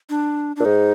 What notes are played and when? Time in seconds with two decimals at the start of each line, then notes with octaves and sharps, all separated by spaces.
0.10 D4
0.56 A#2 D4
0.65 G#2 D#4